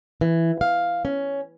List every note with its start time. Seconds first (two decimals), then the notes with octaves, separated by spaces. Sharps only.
0.21 E3
0.61 F5
1.05 C#4